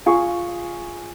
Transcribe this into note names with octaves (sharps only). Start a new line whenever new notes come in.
F4 G#4 C#6